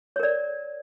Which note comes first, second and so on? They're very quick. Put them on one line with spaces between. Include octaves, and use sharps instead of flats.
C#5 A#4 D5